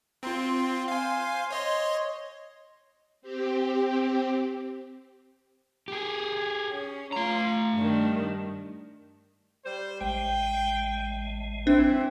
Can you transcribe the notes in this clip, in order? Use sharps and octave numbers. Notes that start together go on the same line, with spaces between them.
C4 F4 C5
F5 G#5
C#5 D#5 C6
C4 G4
G4 G#4
C#4
A3 F4 A#5
G2 D#3 D4
G3 C5
A1 G#3 G5
E3 C4 D4 E4